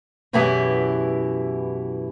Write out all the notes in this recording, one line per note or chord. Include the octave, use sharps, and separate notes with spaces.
F#2 B2 E3 E4 G4 G#4